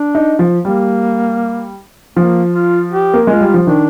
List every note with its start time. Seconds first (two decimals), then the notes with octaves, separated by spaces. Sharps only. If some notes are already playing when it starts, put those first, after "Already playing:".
Already playing: D4
0.15 D#4
0.39 F3
0.65 G3 A#3
2.16 F3 A#3
2.54 F4
2.92 G4
3.14 A#3
3.27 G#3 F4
3.41 G3
3.54 F3
3.67 D#3 D4